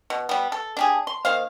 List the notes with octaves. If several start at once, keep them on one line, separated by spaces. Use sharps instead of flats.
B2
G3 B3
A4
D4 G4 G#4
C6
D#3 A#3 C5 F5